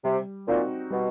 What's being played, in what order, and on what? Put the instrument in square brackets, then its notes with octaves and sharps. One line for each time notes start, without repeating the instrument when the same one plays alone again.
[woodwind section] C3 [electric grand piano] G3
[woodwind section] A#2 [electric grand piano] C4 D#4 F#4
[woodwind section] B2 [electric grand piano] G3